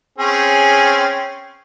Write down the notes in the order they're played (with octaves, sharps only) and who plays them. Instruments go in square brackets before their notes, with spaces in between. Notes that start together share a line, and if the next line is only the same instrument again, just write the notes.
[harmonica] C4 C#4 G#4